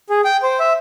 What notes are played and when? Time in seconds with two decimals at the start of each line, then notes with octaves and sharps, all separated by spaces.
0.10 G#4
0.25 G5
0.42 C5
0.60 E5